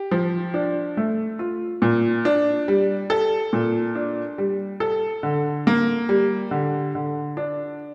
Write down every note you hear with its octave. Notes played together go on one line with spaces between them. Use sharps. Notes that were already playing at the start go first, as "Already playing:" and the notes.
Already playing: G4
F3
D4
A3
F4
A#2
D4
G3
A4
A#2
D4
G3
A4
D3
A#3
G3
D3
D3
D4